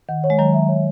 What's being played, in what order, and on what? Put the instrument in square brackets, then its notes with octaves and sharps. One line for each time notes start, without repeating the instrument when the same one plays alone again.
[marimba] D#3 [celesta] F#5
[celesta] C#5
[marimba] G#3
[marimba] D#3 F#3 [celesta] A#5
[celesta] E5
C#5